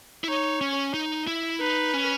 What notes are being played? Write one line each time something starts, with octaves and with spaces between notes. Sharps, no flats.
E4
D#4 C#5
C#4
D#4
E4
D#4 B4
C#4